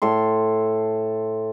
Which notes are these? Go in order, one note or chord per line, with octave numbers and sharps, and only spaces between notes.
A2 A4 C6